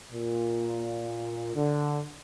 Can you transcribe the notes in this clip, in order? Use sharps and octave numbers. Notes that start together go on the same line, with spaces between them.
A#2
D3